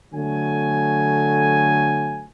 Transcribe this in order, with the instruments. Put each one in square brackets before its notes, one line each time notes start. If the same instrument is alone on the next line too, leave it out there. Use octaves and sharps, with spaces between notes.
[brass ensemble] D3 F#3 A3 G#5